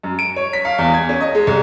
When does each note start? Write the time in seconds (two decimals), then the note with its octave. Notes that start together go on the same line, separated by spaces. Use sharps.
0.03 F#2
0.19 D7
0.36 C#5
0.53 B6
0.65 F5
0.78 E2
0.94 G#6
1.09 C#4
1.21 D#5
1.35 G#3
1.47 C2